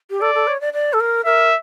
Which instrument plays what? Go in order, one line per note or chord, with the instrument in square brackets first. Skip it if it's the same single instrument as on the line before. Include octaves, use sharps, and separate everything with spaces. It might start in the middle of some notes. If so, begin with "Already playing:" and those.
[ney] G4
[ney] A4 [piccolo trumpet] D5
[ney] A4
C#5
D5
D5
A4
A#4
[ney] A#4 [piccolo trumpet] E5